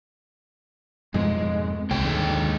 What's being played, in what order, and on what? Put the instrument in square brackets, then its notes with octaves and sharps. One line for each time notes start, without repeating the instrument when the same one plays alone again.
[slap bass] F2 G#2 B2 [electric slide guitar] G#3
[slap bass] C2 [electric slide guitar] G#3 C#5 G5
[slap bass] D#2 G#2 D3